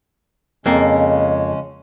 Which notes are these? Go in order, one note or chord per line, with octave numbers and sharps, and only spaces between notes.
F2 C#3 G#3 A#3 C#4